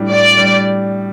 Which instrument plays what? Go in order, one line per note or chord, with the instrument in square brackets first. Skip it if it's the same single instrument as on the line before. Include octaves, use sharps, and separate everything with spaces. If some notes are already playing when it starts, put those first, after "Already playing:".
Already playing: [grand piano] A2 G3 D4
[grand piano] A2 [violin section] D5
[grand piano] G3 D4